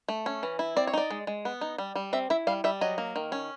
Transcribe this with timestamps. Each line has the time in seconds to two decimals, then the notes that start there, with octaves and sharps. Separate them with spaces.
0.09 A3
0.26 C#4
0.43 E3
0.59 E4
0.76 C4 D5
0.87 C#5
0.94 D#4 D5
1.10 G#3
1.27 G#3
1.45 B3
1.61 D#4
1.78 G3
1.96 G3
2.13 C4 E5
2.30 E4 E5
2.47 G3 F5
2.64 G3 E5
2.81 F#3 D#5
2.98 A#3
3.16 D#3
3.32 C#4